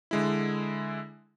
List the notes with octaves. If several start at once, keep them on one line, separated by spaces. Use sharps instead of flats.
D3 G#3 E4